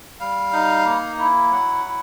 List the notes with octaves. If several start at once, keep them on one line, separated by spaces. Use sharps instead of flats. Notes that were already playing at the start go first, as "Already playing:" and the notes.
G3 F5
D#4
A#3
E4
F#3 F#5
E4